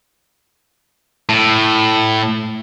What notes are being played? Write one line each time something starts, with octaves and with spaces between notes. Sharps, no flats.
A2